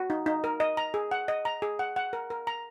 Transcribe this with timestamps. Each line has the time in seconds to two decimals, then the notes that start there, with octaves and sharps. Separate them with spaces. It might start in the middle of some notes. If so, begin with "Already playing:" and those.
Already playing: F#4
0.10 D#4
0.26 D#4
0.44 A#4
0.60 D#5
0.77 A#5
0.94 G#4
1.11 F#5
1.28 D#5
1.45 A#5
1.62 G#4
1.79 F#5
1.96 F#5
2.13 A#4
2.30 A#4
2.47 A#5